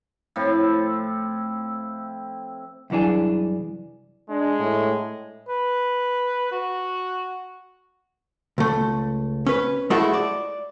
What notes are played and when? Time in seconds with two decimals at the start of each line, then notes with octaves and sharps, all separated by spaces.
0.36 A2 F3 C4 E4
2.90 C2 F#2 E3 D4 G#4
4.30 G#3 D4
4.59 A2
5.48 B4
6.52 F#4
8.58 C#2 A3
9.46 C#4 B4
9.90 G#3 A3 E4 F#4 A4
10.14 D5